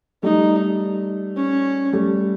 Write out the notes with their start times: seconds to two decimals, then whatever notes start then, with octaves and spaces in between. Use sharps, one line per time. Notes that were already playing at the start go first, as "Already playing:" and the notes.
0.23 G3 A3 D#4
1.36 C#4
1.93 G3 A3